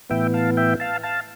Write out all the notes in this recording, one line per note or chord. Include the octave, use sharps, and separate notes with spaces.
A2 E3 B3 E5 G5
F5 A5
E5 G5
F5 A5
F5 A5